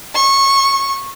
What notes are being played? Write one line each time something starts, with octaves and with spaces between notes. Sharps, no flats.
C#6